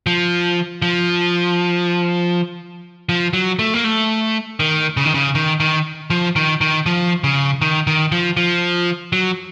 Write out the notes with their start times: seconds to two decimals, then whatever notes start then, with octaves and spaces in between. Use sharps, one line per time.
0.07 F3
0.82 F3
3.09 F3
3.33 F#3
3.59 A3
3.74 A#3
3.84 A3
4.60 D#3
4.97 C#3
5.06 D#3
5.14 C#3
5.35 D#3
5.60 D#3
6.10 F3
6.36 D#3
6.61 D#3
6.86 F3
7.24 C#3
7.61 D#3
7.87 D#3
8.12 F3
8.37 F3
9.12 F#3